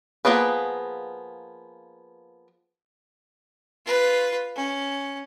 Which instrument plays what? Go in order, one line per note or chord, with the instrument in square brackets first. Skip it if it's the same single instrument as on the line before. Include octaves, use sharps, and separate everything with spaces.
[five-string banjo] F3 A#3 B3 G#4 B4
[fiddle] F4 B4
C#4